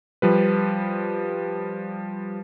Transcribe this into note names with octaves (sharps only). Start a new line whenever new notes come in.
F3 G3 B4